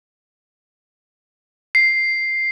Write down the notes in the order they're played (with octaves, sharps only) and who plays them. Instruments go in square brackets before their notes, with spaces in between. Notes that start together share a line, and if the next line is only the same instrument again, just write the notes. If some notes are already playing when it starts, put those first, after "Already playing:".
[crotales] C7